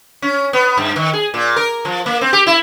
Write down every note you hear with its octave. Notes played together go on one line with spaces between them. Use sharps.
C#4
B3
G2
D#3
G#4
A#2
A#4
F3
A#3
C4
G4
E4